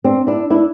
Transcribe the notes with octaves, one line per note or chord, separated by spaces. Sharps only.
C4 D4
D4 E4
D4 E4